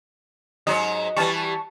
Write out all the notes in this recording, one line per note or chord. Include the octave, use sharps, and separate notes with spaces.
G#2 F#3 D#5
E3 G3 A5 C#6